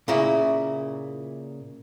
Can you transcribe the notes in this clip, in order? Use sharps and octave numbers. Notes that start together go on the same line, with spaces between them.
A#2 C#3 A#3 E4